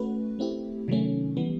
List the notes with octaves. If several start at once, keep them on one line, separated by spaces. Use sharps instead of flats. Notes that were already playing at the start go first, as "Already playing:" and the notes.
Already playing: A3 C#4 F#4 B4
A3 C4 E4 G4
C3 D#3 F#3 A3 C#4
E3 G3 B3